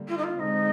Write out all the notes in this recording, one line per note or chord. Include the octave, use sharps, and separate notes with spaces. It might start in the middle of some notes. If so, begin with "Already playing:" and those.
Already playing: D3 G3 A#3
F4
D#4
F4
D3 G#3 C4 D#4